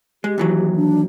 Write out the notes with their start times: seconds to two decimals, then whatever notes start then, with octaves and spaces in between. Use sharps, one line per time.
0.24 G#3 G4
0.38 D#2 E3 F#3
0.76 D4